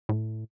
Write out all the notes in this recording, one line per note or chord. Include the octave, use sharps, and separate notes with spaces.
A2